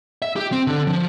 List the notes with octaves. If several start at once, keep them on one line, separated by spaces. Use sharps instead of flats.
E5
G4
C4
D3
F3